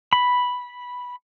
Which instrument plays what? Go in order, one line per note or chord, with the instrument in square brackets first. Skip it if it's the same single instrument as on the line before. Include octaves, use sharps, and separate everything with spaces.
[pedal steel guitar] B5